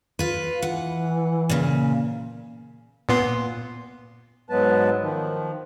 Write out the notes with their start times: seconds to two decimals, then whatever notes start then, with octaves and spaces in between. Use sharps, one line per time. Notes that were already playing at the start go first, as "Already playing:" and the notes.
0.19 F4 B4
0.62 E3 F#5
1.49 A#2 C#3
3.09 A#2 B3 C6
4.49 G#2 F#3 G#3 B3 B4 A5
5.02 D#3 F3